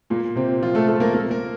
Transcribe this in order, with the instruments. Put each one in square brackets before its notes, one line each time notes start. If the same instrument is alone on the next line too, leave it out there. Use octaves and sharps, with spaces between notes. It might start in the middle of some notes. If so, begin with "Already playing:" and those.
[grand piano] A#2 A#3
C3 C4
F3 F4
A3 A4
A3 A4
A#3 A#4
A#3 A#4
A#3 A#4